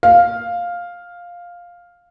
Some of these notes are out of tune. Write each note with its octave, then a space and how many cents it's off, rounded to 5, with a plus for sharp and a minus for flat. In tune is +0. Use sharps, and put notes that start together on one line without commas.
F5 +5